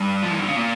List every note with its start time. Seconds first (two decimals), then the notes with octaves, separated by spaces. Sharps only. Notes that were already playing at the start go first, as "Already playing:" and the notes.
Already playing: G2
0.23 F3
0.31 E3
0.39 D3
0.47 C#3
0.56 A#2